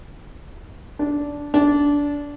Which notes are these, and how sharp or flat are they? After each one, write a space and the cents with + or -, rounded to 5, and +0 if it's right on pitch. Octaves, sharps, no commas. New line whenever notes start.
D4 -15
D4 -20